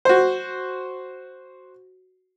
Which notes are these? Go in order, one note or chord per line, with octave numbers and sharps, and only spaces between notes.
F#4 C5